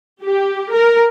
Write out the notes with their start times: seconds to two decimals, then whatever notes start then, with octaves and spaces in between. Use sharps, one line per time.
0.23 G4
0.73 A#4